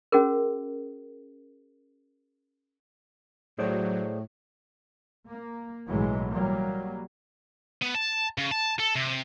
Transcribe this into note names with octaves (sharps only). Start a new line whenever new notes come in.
C#4 F#4 G#4 A#4
A2 F#3 G#4 C5 D5
A#3
B1 A2 E3 F#3 G#3
F#3 G3 A#3
B3
A5
C#3
A5
A4
C3